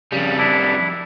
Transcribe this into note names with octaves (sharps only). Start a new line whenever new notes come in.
F2 C#3 G3
D4 E4